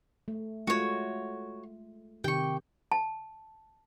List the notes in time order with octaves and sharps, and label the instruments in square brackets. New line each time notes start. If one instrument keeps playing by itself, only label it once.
[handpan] A3
[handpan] G#3 A3 F4 [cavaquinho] F#4 C#5
[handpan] C3 D#3 G4 [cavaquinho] G5 C#6
[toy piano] A5